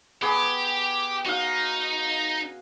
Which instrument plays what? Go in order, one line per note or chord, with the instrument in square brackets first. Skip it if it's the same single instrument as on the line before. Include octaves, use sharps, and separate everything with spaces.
[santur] B3 G#4 [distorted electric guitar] G4
[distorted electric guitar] D#4 [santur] F#4 F5